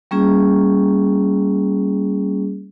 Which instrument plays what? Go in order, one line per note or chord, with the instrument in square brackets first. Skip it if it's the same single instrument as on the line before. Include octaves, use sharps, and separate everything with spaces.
[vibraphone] G3 A#3 C#4 F4 G#4